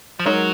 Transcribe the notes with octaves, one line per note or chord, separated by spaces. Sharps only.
F3
F#3 G#3 D#4 A#4 C#5